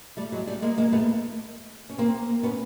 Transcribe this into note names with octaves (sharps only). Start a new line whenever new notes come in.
G3 A3
F#3 G#3
G3 A3
G#3 A#3
G#3 A#3
A3 B3
C#4
A#3 C4
B3 C#4